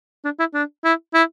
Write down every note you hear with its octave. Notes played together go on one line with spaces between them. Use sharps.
D4
E4
D4
E4
E4